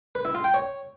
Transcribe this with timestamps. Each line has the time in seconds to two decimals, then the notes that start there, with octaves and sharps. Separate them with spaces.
0.15 B4
0.25 E4
0.35 F4
0.44 G5
0.54 C#5